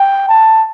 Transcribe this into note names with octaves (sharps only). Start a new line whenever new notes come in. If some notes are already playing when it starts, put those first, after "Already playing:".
Already playing: G5
A5